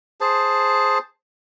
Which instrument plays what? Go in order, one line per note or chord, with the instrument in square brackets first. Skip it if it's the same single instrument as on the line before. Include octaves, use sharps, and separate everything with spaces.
[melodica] G#4 C5 A5